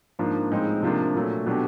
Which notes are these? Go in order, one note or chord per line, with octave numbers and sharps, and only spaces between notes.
G#2 F3 A#3 D4
A2 F3 G#3 C4 D#4
C3 F3 A#3 D4
A#2 F#3 A3
B2 F#3 A3 D4 G4